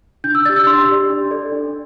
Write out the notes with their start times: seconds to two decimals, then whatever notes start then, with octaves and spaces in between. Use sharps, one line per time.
0.24 D4 G6
0.35 E6
0.45 G4 D5 A6
0.56 E6
0.67 D4 C6
0.88 G4 D5
1.10 D4
1.31 A4 D5
1.52 D4